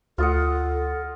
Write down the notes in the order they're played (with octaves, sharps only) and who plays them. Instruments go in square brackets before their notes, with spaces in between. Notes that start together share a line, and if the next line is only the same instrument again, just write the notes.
[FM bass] D2 [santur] F4 D#5 F#5 [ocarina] A4